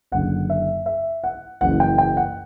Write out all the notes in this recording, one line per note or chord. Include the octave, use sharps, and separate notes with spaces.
F#1 F#2 D3 F#5
E5
E5
F#5
F#1 F#2 E3 F#5
G5
G5
F#5